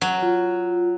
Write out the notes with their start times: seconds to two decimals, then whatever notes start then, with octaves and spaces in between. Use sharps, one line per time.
0.01 F#3
0.22 F4